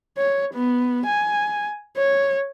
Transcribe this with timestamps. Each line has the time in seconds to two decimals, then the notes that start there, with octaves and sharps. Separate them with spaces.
0.17 C#5
0.54 B3
1.06 G#5
1.97 C#5